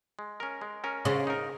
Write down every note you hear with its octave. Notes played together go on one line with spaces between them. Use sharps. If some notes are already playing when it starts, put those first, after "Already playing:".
G#3
C#4 A#4
G#3
C#4 A#4
C#3 G#3
D#4 A#4